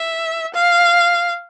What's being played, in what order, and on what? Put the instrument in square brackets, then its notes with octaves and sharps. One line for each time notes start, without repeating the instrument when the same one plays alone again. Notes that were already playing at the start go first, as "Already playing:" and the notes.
Already playing: [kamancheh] E5
F5